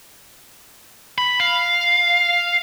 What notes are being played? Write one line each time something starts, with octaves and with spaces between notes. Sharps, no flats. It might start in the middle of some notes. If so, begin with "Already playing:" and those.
B5
F5